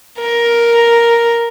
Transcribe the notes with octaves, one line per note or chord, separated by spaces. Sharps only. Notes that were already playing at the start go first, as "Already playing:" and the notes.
A#4